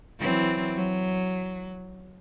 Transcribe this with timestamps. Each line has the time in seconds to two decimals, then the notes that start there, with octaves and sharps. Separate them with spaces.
0.20 E3 F#3 C4
0.76 F#3